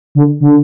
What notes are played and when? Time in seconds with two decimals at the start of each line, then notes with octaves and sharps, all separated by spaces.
0.15 D3
0.40 D3